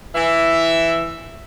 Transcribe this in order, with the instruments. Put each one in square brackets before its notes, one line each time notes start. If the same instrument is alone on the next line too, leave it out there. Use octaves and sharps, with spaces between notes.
[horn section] E3 E5